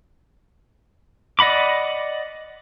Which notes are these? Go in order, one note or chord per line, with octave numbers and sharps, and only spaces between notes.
D5 D#5 F#5 B5 D6